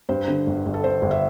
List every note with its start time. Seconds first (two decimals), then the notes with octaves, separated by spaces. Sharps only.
0.09 G2 C5
0.28 D3
0.47 G1
0.66 G1
0.74 A4
0.84 D3 C5
1.02 G1
1.11 E5